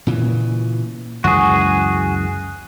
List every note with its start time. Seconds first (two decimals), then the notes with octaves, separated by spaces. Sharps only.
0.07 A#2 C#3 E3
1.24 C#2 F#2 E3 F#4 G#4